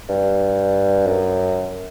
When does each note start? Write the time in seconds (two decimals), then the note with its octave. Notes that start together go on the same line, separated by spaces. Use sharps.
0.09 G2
1.07 F#2